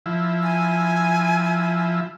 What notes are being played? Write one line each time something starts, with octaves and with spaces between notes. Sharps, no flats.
F3 E4
G#5